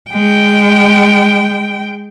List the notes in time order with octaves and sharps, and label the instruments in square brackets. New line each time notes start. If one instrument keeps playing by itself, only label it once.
[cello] G#3 G5